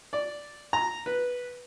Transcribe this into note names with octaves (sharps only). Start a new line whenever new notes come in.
D5
A#5
B4